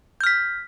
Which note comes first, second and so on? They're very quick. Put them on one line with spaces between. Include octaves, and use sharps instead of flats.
G6 F6 B6